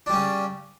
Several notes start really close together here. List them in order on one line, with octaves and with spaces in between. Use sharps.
D4 G3 C#4 C#3